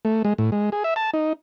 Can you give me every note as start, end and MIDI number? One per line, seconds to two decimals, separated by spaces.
0.05 0.23 57
0.25 0.33 56
0.38 0.50 45
0.52 0.70 56
0.72 0.83 68
0.84 0.94 76
0.96 1.11 81
1.13 1.33 63